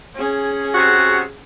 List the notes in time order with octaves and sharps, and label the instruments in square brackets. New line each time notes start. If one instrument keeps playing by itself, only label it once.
[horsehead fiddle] C#4 G#4
[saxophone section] C3 F#4